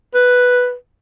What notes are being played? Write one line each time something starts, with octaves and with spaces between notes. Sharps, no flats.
B4